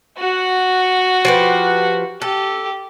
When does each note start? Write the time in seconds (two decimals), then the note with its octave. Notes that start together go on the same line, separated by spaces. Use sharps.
0.18 F#4 F#5
1.25 F3 G4 B4
2.22 G4 A4